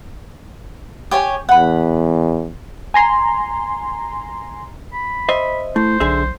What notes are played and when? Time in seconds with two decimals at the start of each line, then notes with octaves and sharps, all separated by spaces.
1.11 G4 C#5 G#5
1.49 E2 F#5 B5
2.94 G#5 A#5 C6
4.93 B5
5.29 C5 D#5 E5
5.76 A3 E4 C5
6.00 B1 D3 G#4 E5